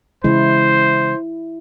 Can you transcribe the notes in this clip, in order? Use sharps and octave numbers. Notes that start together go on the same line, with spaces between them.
C#3 E3 G#3 E4 C5